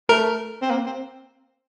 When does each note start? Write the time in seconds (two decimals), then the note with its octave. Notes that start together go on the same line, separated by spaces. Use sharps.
0.09 A3 A#4
0.62 C4
0.71 A#3
0.86 C4